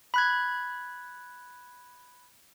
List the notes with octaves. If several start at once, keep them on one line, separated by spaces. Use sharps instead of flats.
B5 F#6 G#6